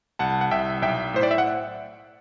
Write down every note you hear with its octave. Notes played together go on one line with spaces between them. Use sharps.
C2 F#5 A5
F#5
C2 E5 G5
B1 E5 G5
A2 C5
D5
E5
F#5